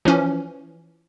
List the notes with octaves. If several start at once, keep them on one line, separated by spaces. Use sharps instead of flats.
E3 F3 C#4